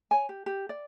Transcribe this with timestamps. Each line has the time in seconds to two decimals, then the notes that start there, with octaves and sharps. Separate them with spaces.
0.11 C#5 G#5
0.29 G4
0.46 G4
0.69 D5